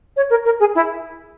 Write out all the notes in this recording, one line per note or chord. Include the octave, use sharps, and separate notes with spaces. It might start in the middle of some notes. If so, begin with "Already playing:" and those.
C#5
A#4
A#4
G#4
E4